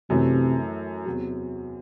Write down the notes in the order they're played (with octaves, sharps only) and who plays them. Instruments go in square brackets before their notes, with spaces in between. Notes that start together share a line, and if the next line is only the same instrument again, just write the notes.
[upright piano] F#2 E3 A3 [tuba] C3
[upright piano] E2 C3 F#3